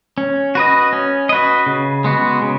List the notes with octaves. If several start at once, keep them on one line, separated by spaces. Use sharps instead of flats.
C#4
F#4 B4 D#5
C#4
F#4 B4 D#5
C#3
G#3 B3 F#4
C#3